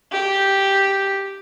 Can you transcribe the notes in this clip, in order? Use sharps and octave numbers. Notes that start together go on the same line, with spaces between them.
G4